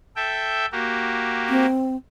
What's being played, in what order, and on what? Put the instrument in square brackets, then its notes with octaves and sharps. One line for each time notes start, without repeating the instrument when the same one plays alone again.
[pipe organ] A4 E5 G5
A#3 F#4 G4
[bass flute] C4